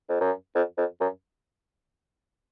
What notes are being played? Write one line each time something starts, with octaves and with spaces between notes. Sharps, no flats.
F2
F#2
F2
F2
F#2